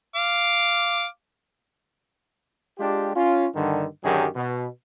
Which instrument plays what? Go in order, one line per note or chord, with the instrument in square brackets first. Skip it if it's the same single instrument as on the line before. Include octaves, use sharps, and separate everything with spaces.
[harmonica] F5 D6
[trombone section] G#3 D4 F4 G4
C#4 F4
G2 D3 D#3
F#2 D3 D#3 F#3 G4 G#4
B2